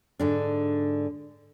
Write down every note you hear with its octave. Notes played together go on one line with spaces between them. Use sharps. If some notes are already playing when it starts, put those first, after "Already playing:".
G#2 D3 D4